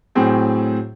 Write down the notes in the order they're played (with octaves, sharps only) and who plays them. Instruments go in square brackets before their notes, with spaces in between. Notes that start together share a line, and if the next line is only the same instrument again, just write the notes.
[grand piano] A2 F#3 C4 G#4